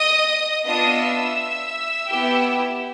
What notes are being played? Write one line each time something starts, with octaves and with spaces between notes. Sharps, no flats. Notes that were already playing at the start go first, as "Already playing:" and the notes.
Already playing: D#5 D#6
B3 D4 F4 D#5 D#6
E5 E6
B3 E4 G4